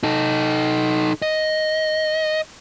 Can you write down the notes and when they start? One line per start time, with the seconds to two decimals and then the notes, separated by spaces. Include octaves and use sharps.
0.03 D#4 A4
1.22 D#5